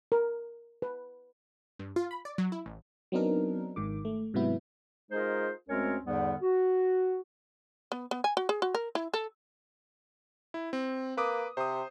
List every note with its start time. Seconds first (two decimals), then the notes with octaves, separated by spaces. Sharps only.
0.12 A#4
0.82 B4
1.79 G2
1.96 F4
2.11 B5
2.25 D5
2.38 F#3
2.52 E4
2.66 A1
3.12 F#3 B3 C4 D4 D#4 A#4
3.76 G#1 G#2 D#3 D6
4.05 A3
4.34 G#2 C3 F#3 B3 E4
5.12 G#3 D#4 F4 G#4 A#4 C5
5.68 D2 G#3 C4 C#4 A#4 C#5
6.05 E2 G#2 D3 G3 B3
6.42 F#4
7.92 B3
8.11 B3
8.24 G#5
8.37 F#4
8.49 G#4
8.62 F#4
8.75 A#4
8.95 E4
9.14 A4
10.54 E4
10.73 C4
11.18 A#3 B4 D6 D#6
11.57 C3 C5 D#6